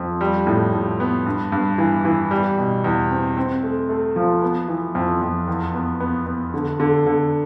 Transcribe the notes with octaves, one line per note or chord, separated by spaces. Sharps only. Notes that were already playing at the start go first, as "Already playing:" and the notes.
Already playing: F2
G3
A2
A2
B3
G2
G2
E3
E3
G3
B2
E2
C4
C4
A3
A3
F3
B3
E3
F2
F2
E2
B3
B3
B3
D3
D3
D3